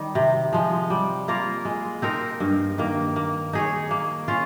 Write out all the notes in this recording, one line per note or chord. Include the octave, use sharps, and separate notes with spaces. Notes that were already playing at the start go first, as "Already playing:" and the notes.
Already playing: D#3 G3
C3
F3 G#3
G3
A#3 F4 A#4
G#3
C4 D#4 A#4
G2
D#3 A#3
A#3
D#4 G#4 C#5
A#3
C#4 F4